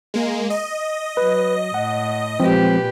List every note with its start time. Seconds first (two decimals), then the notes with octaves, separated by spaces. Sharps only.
0.14 G#3 A#3
0.50 D#5
1.17 F#3 B4
1.74 A2 F#5
2.40 A#2 F3 G#3 C4 G4 B4